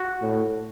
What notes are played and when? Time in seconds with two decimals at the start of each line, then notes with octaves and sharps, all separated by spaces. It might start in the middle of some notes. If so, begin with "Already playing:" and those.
Already playing: F#4
0.22 A2